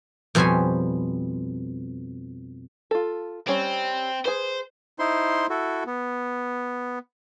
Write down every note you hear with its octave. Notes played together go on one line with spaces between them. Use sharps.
F2 B2 G3 C5 C#5 G#5
F4 A4
G3 C4 C#4
G#4 B4 C5
D#4 E4 C5 C6
E4 F#4 A4
B3